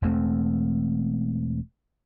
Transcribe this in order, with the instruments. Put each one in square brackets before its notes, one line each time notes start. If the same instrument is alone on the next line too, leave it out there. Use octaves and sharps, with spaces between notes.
[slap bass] E1 E2 A3 C4